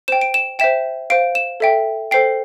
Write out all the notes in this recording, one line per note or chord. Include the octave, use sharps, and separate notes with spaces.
C5 G5 E7
D7
E7
C5 E5 G5 E7
C5 F5 D7
E7
A4 E5 G5
A4 C5 G5 C7